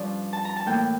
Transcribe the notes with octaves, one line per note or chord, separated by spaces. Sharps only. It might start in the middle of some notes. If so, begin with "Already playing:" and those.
Already playing: G2 F3 C#4 D5
A5
A#5
A5
A2 E3 A#3 G5